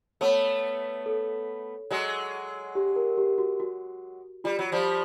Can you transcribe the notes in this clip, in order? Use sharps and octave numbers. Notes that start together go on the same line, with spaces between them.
A3 B3 C#5
A4
F#3 G#3
G4
A#4
G4
F#4
F#4
G3 F4
F#3
F3 G3